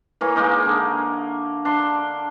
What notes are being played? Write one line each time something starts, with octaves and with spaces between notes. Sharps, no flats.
E3 A#3 C#5
G#3 A#3 D#4
D3
D4 C6